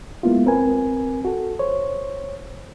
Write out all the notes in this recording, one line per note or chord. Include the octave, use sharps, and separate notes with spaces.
G#3 A#3 B3 E4 F4
C4 A#4 B4 G#5
F#4 A4
C5 C#5